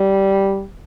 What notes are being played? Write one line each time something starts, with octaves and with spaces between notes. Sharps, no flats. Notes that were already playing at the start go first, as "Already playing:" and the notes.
Already playing: G3